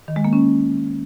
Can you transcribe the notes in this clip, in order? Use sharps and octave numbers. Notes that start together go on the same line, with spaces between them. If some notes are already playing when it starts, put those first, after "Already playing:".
D#3
G#3
A#3
C#4